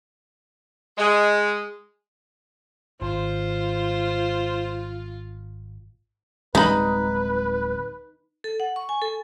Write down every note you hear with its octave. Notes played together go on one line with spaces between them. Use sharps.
G#3
G#1 F4 C5
D1 G3 G#3 C4 D#4 B4 B5
A4
F#5
C#6
G#5
A4